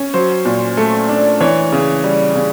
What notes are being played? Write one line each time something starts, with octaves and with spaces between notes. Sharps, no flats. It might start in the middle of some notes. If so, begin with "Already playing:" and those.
Already playing: C#4
F#3 C5
A#2
A3
D4
E3 C#5
C#3
G3
C#3